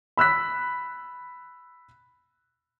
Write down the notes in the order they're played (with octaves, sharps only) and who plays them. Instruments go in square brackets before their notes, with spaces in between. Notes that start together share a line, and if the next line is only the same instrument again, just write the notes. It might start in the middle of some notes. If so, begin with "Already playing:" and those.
[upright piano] B5 E6 F#6 B6